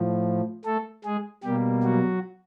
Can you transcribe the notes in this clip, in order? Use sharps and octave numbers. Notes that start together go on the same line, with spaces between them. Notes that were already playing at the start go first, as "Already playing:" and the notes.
Already playing: A2 F3
A3 A4
G#3 G#4
B2 G3 A#3 G4
F#3 F#4